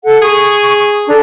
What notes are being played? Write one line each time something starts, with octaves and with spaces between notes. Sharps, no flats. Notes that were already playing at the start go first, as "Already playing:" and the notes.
A4 F#5
G#4 C#6 D#6
D4 A4 A#5